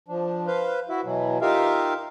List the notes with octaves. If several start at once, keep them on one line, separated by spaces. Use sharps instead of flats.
F3 D4
B4 C5 F5
E4 F#4 E5
B2 E3 F#3
D#4 F4 G4 A#4 E5 F5